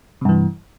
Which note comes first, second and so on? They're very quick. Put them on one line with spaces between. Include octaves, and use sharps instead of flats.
C3 G2 E3